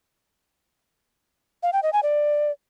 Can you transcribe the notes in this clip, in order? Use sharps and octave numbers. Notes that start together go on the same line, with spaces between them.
F5
G5
D#5
G#5
D5